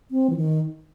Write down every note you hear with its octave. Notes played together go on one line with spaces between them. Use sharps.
C4
E3
D#3